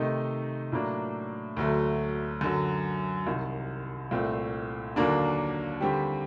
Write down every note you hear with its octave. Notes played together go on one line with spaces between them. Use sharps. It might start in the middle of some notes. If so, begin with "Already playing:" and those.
Already playing: C3 D#3 A3 D#4
A2 F#3 A#3 D4
D2 D3 F#3 A3
F#2 D3 F#3
C2 C3 D#3
C2 A#2 A3 C4
D#2 D3 F#3 A#3 D4
D#2 D3 G3 C4 G4